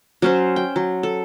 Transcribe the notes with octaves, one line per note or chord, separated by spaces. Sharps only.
F#3 C#4 C5
G5
F#3
A4